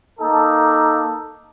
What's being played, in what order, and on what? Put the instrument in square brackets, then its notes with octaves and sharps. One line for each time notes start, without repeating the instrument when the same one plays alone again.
[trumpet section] A#3 D#4 A4